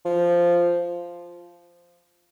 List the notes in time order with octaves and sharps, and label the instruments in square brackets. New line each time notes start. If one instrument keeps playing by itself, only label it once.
[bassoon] F3